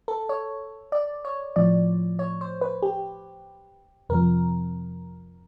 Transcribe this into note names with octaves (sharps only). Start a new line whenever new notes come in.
A4
C#5
D5
C#5
A2 F3 D5
C#5
C5
B4
G4
F2 C3 F3 A#4